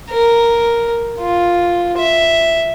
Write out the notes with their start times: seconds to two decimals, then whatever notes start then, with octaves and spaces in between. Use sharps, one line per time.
0.10 A#4
1.20 F4
1.98 E5